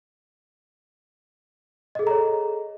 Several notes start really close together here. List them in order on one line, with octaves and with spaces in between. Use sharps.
D#5 G#4 A4 A#5 C#5